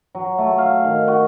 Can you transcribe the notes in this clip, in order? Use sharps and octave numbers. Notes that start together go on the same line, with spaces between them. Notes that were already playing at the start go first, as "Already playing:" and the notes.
F#3
A3
F5
D#3
F#4